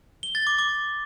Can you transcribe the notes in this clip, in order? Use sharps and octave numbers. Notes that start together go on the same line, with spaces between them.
G7
A6
D6
D6